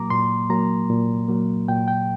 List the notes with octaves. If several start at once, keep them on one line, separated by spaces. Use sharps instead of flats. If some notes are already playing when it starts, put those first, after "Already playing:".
Already playing: A#2 F#3 A#3 A#5 D6
A#2 C6
F#3 A#3 A#5
A#2
F#3 A#3
A#2 G5
G5